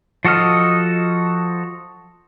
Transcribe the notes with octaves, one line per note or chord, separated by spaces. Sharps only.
F3 F#4 A4 D#5 F6